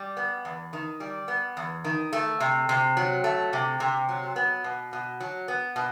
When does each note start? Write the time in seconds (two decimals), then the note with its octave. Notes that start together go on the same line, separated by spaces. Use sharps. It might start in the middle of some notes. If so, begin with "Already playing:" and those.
Already playing: G3
0.17 B3
0.45 E2
0.73 D#3
1.00 G3
1.28 B3
1.57 E2
1.84 D#3
2.13 A3
2.40 C3
2.69 C3
2.97 F#3
3.24 A3
3.53 C3
3.80 C3
4.09 F#3
4.36 B3
4.64 B2
4.93 B2
5.20 F#3
5.48 B3
5.76 B2